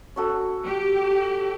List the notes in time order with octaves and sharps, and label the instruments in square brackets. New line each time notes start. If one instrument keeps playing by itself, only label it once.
[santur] C#4 F#4 A4
[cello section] G4